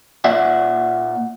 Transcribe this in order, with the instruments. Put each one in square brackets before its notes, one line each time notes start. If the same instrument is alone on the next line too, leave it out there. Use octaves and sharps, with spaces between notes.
[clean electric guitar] A#2 D5 E5 F#5